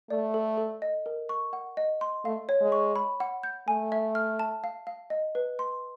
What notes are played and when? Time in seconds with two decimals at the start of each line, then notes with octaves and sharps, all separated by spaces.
0.10 A3 D5
0.34 A4
0.58 A4
0.82 D#5
1.06 A#4
1.29 C#6
1.53 F#5
1.77 D#5
2.01 C6
2.25 A3 F5
2.49 C#5
2.61 G#3
2.72 C#6
2.96 B5
3.20 F#5
3.43 G6
3.68 A3 G#5
3.92 E5
4.15 F6
4.39 A5
4.64 F5
4.87 F5
5.10 D#5
5.35 B4
5.59 C6